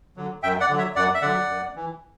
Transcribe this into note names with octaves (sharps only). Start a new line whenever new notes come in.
D3 F#3
F#2 E5 G5
D5 F#5
D3 F#3
C#5 E5
F#2 D5 F#5
E5
D3 F#3 D5 F#5
F#2
E3